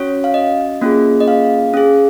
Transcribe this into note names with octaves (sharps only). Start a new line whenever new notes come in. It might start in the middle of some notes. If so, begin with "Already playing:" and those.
Already playing: C#4 F#4 C#5
F5
D#5
A#3 C#4 F4 G#4
D#5
F5
C#4 G#4